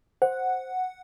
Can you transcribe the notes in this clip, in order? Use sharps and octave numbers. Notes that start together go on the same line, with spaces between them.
C5 F#5